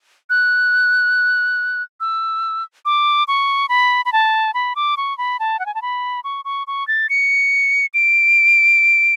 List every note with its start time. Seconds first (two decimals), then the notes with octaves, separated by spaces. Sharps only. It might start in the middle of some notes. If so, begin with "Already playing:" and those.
0.30 F#6
2.00 E6
2.85 D6
3.28 C#6
3.69 B5
4.05 B5
4.13 A5
4.54 B5
4.76 D6
4.97 C#6
5.18 B5
5.40 A5
5.59 F#5
5.66 G#5
5.75 A5
5.82 B5
6.24 C#6
6.45 C#6
6.67 C#6
6.88 A6
7.10 C#7
7.94 D7